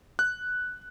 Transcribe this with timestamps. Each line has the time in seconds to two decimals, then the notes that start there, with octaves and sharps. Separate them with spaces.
0.19 F#6